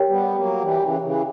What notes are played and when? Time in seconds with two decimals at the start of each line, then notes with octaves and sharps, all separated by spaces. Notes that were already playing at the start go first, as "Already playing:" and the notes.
Already playing: G4 A#4 C#5 G5
0.08 G3 B3
0.35 F#3 A#3
0.61 E3 G3
0.81 C#3 E3
1.01 C#3 E3